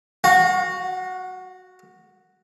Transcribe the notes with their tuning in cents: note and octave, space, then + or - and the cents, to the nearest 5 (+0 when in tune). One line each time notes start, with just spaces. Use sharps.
F#4 +0 F5 +45